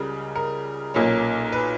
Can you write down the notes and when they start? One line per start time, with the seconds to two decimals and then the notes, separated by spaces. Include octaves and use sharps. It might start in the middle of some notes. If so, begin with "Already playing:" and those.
Already playing: C#2 C#3 G3 A#4
0.36 A#4
0.94 B1 A#2 A#3 C#4
1.52 B4